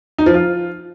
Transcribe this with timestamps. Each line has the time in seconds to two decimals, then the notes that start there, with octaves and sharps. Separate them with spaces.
0.18 D#4
0.26 F3
0.34 F4